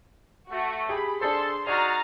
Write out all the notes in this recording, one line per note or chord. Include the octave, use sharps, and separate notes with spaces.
A3 F#4
G4 G#4 B5
D4 G#4 A4 C5 C6
D#4 F#4 G#4 D5 A#5 F6 A6